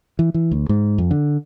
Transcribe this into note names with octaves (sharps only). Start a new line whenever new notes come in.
E3
E3
D2
G#2
F2
D3